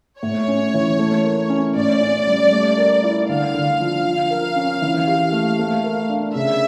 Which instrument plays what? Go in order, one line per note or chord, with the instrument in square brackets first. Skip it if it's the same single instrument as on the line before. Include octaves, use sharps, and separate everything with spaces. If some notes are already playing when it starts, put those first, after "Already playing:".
[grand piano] A2 [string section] C#5
[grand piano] C#4
E3
A3
A#4
C#4
[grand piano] A2 [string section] D5
[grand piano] C#4
G3
A3
A#4
E4
[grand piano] D3 [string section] F5
[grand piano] D3
F3
F3
A#4
C#4
E3
G4
A3
A3
A#4
D4
[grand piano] C#3 [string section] E5